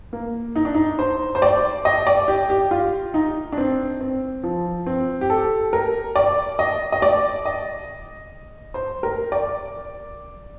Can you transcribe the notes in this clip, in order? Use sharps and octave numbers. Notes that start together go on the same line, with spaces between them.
A#3
D#4
D4
D#4
C5
C5
D5
D#5
D5
G4
G4
F4
D#4
D4
C4
C4
F3
C4
G4
A4
A#4
D5
D#5
D#5
D5
D#5
C5
A#4
D5